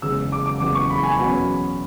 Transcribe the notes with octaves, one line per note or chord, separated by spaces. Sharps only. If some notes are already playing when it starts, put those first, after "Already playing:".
F#1 E2 C#3 G#3 C#4 E6
D6
D6
F#1 E2 C#3 G#3 C#4 D6
C#6
B5
G#5
E2 B2 F#3 C#4 B5